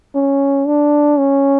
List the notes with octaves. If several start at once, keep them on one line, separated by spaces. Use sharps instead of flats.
C#4
D4
C#4